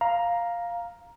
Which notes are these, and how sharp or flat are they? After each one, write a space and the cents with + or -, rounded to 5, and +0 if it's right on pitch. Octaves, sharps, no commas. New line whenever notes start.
F5 +0 A#5 +10